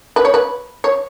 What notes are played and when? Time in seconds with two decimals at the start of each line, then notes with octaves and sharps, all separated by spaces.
0.16 B4
0.25 C#5
0.34 B4
0.84 C#5